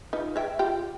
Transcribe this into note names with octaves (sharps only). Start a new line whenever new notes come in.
D#4 F4 B4
C#5 E5 G5
F4 G4 G5